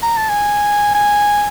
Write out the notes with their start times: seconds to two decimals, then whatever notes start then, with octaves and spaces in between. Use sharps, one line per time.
0.03 A#5
0.17 A5
0.29 G#5
0.95 G#5